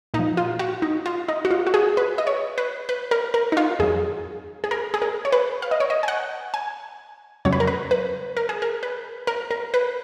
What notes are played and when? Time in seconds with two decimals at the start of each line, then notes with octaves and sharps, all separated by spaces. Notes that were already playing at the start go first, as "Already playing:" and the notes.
0.14 A#2 D#4
0.19 F3
0.37 F4
0.59 F#4
0.82 D#4
1.06 F4
1.28 D#4
1.45 F#4
1.51 F4
1.67 F#4
1.74 G#4
1.97 B4
2.18 D#5
2.27 C#5
2.58 B4
2.89 B4
3.11 A#4
3.34 A#4
3.52 D#4
3.57 F4
3.79 F2 D#3 F#3 G#4
4.64 G#4
4.71 A#4
4.94 G#4
5.02 A#4
5.25 C#5
5.32 B4
5.62 F5
5.71 D#5
5.80 C#5
5.90 D#5
6.03 G#5
6.08 F#5
6.54 G#5
7.45 F2 C#3 F#3 C#5
7.52 B4
7.60 A#4
7.67 B4
7.91 B4
8.37 A#4
8.49 G#4
8.62 A#4
8.83 B4
9.27 A#4
9.51 A#4
9.74 B4